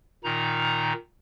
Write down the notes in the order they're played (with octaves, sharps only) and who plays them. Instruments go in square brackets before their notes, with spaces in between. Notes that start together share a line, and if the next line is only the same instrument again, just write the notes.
[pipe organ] A#2 D#3 D#4 A#5